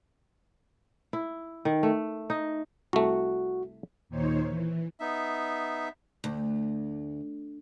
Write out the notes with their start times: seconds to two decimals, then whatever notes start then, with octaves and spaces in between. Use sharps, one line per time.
1.13 E4
1.65 D#3
1.83 A3
2.30 D#4
2.93 C2 A3 F#4
4.09 D#2 A#2 D#3 D#4 C5 C#5
4.48 E3
4.99 B3 D#4 E5
6.24 D2